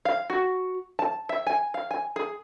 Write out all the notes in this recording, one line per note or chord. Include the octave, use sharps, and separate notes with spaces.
F5
F#4
A5
E5
G#5
F5
G#5
G#4